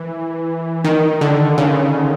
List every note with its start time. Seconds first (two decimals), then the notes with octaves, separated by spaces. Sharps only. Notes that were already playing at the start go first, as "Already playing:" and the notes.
Already playing: E3
0.84 D#3
1.21 D3
1.58 C#3